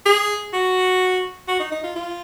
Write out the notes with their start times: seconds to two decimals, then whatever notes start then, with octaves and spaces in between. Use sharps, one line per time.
0.06 G#4
0.53 F#4
1.48 F#4
1.60 D#4
1.72 D#4
1.84 F4
1.96 F4